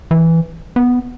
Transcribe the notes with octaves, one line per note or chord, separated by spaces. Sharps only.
E3
B3